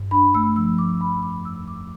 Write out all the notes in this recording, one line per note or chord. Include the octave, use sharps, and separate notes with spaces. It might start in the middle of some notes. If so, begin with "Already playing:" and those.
Already playing: G2
D4 B5
A3 E6
F3 E6
F3 D6
F3 B5
F2 D6
F2 E6
F2 D6